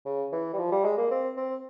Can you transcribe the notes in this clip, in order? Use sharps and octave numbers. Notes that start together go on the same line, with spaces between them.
C#3
E3
G3
F3
G3
G#3
A#3
C4
C4